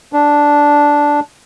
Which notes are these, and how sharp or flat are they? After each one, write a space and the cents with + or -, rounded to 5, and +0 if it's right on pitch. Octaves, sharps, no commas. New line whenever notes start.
D4 -5